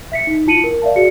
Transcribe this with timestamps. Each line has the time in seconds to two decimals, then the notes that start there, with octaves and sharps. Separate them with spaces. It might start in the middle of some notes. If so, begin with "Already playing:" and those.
0.12 E5 B6 C#7
0.27 D#4
0.46 E4 F4 A5 C#7 D#7 F#7
0.64 A#4
0.82 D5 E5 F5 A5
0.96 F#4 G#4 D5 C#7